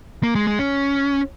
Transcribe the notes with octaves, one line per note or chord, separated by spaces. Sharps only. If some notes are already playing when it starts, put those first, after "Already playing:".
A#3
G#3
G#3
C#4